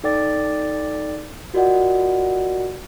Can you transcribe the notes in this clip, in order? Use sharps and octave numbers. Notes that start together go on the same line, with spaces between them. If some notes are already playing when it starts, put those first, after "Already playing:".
D#4 A4 D5 G5 D6 A6
F4 F#4 A#4 D5 D#5 F#5